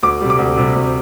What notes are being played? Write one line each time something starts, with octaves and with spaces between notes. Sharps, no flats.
D2 D6
C3 G3
D6
D2
C3 G3
D2